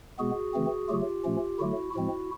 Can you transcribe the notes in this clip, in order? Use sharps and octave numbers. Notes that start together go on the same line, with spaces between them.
B2 G#3 B3 F#4 G#4
C#3 E3 A3 C4
C#3 F#3 A3 F4 G4
A#2 F3 A3 C#4
D3 F#3 A3 E4 F#4
A2 F3 G#3 C4 E4 F#4